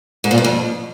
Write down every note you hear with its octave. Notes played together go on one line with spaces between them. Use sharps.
G#2
A#2
G2
F2